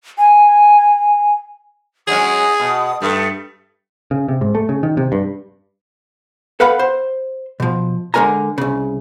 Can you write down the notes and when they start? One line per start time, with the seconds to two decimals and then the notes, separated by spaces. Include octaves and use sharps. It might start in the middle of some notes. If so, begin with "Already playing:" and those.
0.18 G#5
2.07 F#3 G#3 C#4 G#4 D#6
2.60 B2
3.02 G2 A3 D#6
4.11 C#3
4.29 C3
4.41 G#2
4.55 A3
4.69 C#3
4.83 D#3
4.97 C3
5.12 G2
6.60 A4 B4 F5 F#5 B5
6.79 C5
7.60 B2 F3
8.14 D3 G#3 A#4 G#5 A#5
8.58 C2 C#3